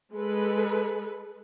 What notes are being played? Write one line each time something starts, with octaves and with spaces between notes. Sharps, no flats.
G#3 A4 B4